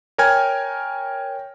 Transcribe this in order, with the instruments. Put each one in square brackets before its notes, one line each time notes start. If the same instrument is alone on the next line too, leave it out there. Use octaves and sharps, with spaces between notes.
[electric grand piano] A#4 C#5 G5 G#5 F6 G#6